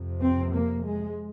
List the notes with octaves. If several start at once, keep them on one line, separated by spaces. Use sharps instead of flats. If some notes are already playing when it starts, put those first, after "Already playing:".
Already playing: F2 C3
C4
A#3
G#3